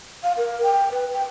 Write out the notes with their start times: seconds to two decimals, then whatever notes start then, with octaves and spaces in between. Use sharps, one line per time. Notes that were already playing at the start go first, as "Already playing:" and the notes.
0.23 F5
0.37 A#4
0.63 G5
0.92 B4
1.13 G5